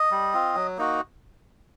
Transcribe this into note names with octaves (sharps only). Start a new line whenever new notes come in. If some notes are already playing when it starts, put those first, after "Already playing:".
Already playing: D#5
G3
C4 F4
F#3
A#3 D#4 F#4